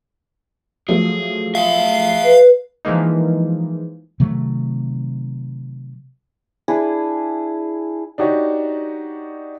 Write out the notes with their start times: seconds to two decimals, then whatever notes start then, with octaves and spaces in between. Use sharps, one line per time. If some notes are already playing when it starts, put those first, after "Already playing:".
0.89 F3 F#3 A3 G#4
1.55 G#4 E5 F5
2.24 B4
2.85 E3 F3 G#3 A#3 D#4
4.20 C3 D#3 F#3 A3
6.68 D4 E4 G#4
8.18 D4 D#4 F#4 G4 C#5